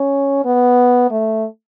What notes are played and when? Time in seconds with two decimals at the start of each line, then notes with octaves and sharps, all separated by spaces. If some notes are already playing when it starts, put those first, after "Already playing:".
Already playing: C#4
0.45 B3
1.11 A3